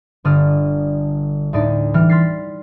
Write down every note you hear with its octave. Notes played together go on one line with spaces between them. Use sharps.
G1 D3 D5 D#6 F6 D#7
D2 A2 D#4 D5
E3 G3 F6
C6 F6 A6 B6 C7